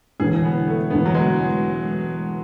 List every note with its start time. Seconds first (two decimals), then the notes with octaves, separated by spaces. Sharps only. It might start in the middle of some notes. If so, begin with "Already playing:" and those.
0.20 E1 E2 D3 G#4
0.44 B3
0.67 A3
0.90 E1 E2 D3 B3
1.06 F#3
1.14 G#3